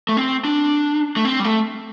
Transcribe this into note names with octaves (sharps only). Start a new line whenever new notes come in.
A3
C4
D4
A3
C4
G3
A3